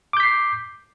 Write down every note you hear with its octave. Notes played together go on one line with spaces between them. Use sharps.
D6 G6 B6 C7